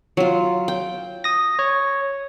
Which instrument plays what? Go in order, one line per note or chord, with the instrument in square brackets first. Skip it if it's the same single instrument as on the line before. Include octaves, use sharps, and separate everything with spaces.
[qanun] F#3 F4
G5
[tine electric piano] D#6 A#6
C#5